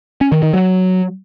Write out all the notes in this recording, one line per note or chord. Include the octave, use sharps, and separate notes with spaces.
C#4
D#3
D#3
F#3